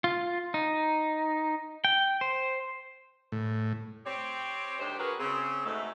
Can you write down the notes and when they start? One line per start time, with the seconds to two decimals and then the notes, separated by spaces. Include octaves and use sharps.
0.04 F4
0.54 D#4
1.84 G5
2.21 C5
3.32 A2
4.06 C4 G4 C#5
4.80 D2 G2 D#3 G4 C5
4.99 D3 F#3 F#4 G#4 A#4 B4
5.20 C#3 C4
5.66 G#2 B2 A3